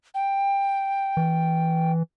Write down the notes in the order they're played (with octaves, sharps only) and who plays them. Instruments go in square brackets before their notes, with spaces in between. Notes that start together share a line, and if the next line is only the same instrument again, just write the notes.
[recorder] G5
[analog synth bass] E3